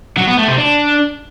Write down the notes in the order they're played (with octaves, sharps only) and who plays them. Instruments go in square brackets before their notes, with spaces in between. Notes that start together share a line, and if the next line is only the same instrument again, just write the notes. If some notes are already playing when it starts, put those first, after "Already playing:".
[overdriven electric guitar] F#3
B3
A3
C3
D4